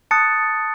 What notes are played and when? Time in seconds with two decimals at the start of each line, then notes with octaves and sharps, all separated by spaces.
0.11 A5 D#6 F#6 A6 C#7